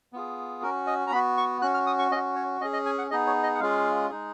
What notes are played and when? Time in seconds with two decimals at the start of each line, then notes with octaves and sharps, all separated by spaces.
0.13 B3 F4 G#4
0.63 C#4 F#4 A#4
0.87 D#5
1.07 A#5
1.12 B3 B5
1.15 F#4
1.37 C#6
1.62 C#4 F#4 F#6
1.74 F6
1.87 D#6
1.99 C#6
2.11 C#4 D#5
2.16 F#4
2.36 C#5
2.61 C#4 D#5
2.65 G#4
2.73 D#5
2.86 G#5
2.98 F#5
3.11 B3 D#4 G#4 D#5
3.27 C#5
3.43 D#5
3.55 F#5
3.60 G#3 C#4 F4 G#4 F5
4.10 G#3 D#4 G#4